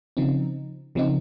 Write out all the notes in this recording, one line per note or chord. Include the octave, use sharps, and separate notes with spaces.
C#3 F3 C4 D#4
C#3 F3 C4 D#4